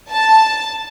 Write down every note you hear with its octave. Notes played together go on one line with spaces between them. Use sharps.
A5